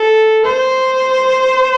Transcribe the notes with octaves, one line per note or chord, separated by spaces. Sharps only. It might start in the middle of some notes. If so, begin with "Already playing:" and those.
Already playing: A4
C5